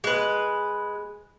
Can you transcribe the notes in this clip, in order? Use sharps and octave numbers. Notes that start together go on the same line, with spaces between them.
G#3 B4